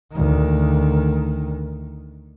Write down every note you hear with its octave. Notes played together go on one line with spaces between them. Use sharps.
D2 D#3